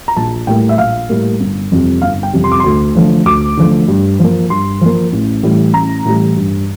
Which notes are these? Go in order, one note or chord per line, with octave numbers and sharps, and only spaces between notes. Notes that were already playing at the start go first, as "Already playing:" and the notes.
A#5
A#1 A5
A2 G3 A#3 G5
E5
A#1 F5
A2 G3 A#3
G1
F2 C3 G3
G1 F5
G5
F2 C3 G3
C6
D6
D2 C6
D3 F3 A3
D2 D6
D3 F3 A3
G2
F3 A#3
G2 C6
F3 A#3
A1
A2 E3 G3
A1 A#5
A2 E3 G3
G2